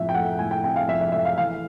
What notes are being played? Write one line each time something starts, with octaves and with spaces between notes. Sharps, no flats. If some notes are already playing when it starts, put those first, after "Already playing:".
Already playing: A2 F3 C4 E5
G5
A3 F#5
A2 G#5
G5
C4 G5
F5
F3 E5
E5
A3 E5
F5
E3 F5